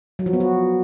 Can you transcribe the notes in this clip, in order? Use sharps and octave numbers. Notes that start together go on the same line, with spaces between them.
F#3
F3
B3
F#4